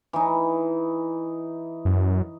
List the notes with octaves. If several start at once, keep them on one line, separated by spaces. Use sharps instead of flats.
E3 D#4
F#2